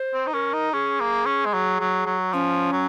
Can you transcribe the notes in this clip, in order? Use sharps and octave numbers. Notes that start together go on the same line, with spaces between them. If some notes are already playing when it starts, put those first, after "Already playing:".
Already playing: C5
C4
D#4
C#4 A#4
D#4
C#4 G#4
A#3
C#4
G#3
F#3
F#3
F#3
F3 C#4
F#3